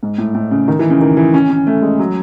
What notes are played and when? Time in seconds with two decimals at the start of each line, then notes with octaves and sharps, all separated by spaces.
0.03 G#2
0.18 A2
0.34 A2
0.51 C#3
0.68 D#3
0.79 E3
0.90 C#3
1.01 D#3
1.17 E3
1.34 C#4
1.50 C#4
1.67 A3
1.82 G#3
1.99 F#3